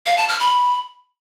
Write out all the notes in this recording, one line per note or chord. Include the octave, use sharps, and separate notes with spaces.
F5
A5
F6
B5